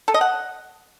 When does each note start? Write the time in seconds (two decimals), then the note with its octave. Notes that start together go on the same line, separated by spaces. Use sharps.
0.08 A4
0.14 D#5
0.21 F#5